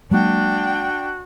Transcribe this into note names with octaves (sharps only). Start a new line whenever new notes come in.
F#3 G#3 A#3 D4 F#4 G5